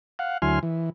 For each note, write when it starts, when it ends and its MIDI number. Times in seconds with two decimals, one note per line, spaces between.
0.19 0.38 77
0.19 0.38 78
0.42 0.59 38
0.42 0.59 54
0.42 0.59 64
0.42 0.59 80
0.42 0.59 84
0.42 0.59 89
0.63 0.90 52